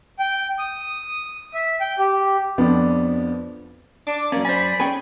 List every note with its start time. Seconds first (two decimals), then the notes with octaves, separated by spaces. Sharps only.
0.19 G5
0.59 D#6
1.54 E5
1.81 G5
1.99 G4
2.58 F2 F3 B3 D4
4.07 D4 D6
4.32 F#2 A#3 C#4 D5
4.45 C5 G#5 B5
4.80 C#4 G#4 B4 G5 G#5